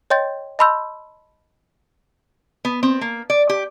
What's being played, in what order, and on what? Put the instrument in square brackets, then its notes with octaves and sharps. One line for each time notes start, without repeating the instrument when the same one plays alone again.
[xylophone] C#5 D#5 G5 C6 G6 A6
D#5 A5 B5 C6 E6 G6
[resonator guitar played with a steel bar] B3
C4
A#3
D5
G4